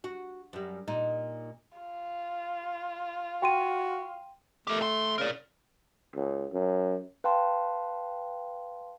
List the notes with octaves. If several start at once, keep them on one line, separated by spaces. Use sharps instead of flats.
F#4
F#2 G3
A#2 D#4
F4
F#4 G5 C6 D#7
A3 G4 A#4
D#2 C6
C#3 A#4 D5
C#2
F#2
B4 F5 G5 A5 C6